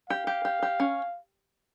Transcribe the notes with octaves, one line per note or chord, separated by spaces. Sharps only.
G4 F5
G4
G4
G4
C#4